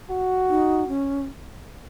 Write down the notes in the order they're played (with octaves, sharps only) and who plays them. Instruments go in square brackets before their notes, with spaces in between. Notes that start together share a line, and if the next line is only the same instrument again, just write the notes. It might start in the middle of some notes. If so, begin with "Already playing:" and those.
[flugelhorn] F#4
[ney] D#4
C#4